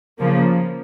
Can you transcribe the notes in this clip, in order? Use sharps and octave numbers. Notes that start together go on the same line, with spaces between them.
C#3 F3 A#3